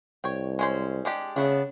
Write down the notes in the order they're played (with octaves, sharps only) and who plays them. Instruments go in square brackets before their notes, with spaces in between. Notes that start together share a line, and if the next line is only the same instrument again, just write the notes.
[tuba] C2 [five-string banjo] C#5 G5
[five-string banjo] G#3 C#4 C5
G#3 D4 G4
[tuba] C#3 [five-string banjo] A3 B3 D4